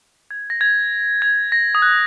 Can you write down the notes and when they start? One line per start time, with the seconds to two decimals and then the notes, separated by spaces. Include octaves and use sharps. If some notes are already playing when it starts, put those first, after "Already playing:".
0.31 G#6
0.50 A#6
0.61 G#6
1.22 G#6
1.52 A#6
1.75 D#6
1.82 F#6